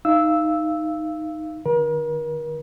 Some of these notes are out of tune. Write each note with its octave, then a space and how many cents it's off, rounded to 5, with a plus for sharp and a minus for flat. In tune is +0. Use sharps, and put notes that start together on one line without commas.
D#4 +0 F5 -25 E6 -5
D3 +40 A#4 +40